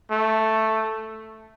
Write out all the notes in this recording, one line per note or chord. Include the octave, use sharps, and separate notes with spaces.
A3